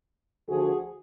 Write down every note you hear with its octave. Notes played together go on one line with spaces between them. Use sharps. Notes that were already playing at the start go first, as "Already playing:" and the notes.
D2 D3 F3 F#4 G#4